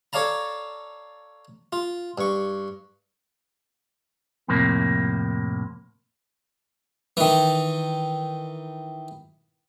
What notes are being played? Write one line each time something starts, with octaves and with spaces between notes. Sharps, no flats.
A4 C#5 D5 F5 A5 A#5
F4
G2 C#6
F2 A2 C3 A#3
D#3 E3